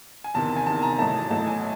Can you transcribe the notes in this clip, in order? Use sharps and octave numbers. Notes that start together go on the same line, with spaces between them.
G#5
E2 C3 D#3 A5
G#5
E2 C3 D#3 A5
A#5
A1 A2 F#3 A3 A5
A1 A2 F#3 A3 A5
G#5